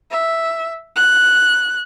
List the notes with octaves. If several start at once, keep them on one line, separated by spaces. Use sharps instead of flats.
E5
F#6